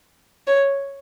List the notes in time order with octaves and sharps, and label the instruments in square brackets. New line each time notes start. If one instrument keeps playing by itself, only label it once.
[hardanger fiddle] C#5